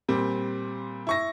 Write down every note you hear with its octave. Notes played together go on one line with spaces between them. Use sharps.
A#2 G3 C4
E4 C#6 A#6